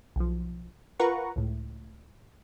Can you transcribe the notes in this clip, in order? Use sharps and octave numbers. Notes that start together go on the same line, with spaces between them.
B1 F3
F4 A#4 B4 F#5 A#5 C#6
C#2 A2